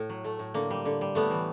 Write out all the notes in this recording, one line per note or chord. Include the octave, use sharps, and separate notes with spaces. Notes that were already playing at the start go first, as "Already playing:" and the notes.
Already playing: A2
F#3
A3
A2
D3 A#3
G3
D3
G3
A2 A3 B3
E3